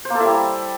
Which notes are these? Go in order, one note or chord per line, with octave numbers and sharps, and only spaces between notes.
C5
A#3
A4
E4
G3